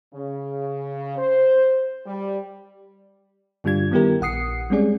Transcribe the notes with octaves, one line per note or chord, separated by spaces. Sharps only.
C#3
C5
G3
G2 D3 G3 D4 F4 G#6
D#3 G3 B3 E4 G4 A#4
A#1 F#5 D#6 C7 C#7
G3 G#3 C4 C#4 G#4 D5